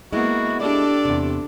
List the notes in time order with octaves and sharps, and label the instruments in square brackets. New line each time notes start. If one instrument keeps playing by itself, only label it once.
[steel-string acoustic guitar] G#3 E4 [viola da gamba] A#3 B3 [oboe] F#4
[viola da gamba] D4 G4 A4 [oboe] D5
[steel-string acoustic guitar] E2 C3